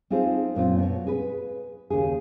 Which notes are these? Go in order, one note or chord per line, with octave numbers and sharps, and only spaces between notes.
C4 D#4 F4 G#4 A4 C5
F#2 A#2 C4 F4
B2 C#5
G#4 B4
D#2 C#3 G4 G#4